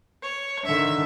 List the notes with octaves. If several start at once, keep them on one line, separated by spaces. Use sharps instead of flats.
C#5
D3 D#3 E5